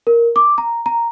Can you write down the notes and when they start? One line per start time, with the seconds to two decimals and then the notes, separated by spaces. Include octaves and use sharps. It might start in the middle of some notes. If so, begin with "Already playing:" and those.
0.07 A#4
0.36 D6
0.58 A#5
0.86 A#5